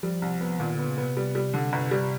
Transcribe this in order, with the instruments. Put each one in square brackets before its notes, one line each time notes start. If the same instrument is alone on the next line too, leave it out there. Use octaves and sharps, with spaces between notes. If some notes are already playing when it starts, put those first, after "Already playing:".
[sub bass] F3 [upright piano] G3
[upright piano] C2
B3
[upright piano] A#2 [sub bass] D#3
[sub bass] D3 [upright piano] B3
[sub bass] C#3
[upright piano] B3
[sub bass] C3
[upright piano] G3
G3
D3
G1
G3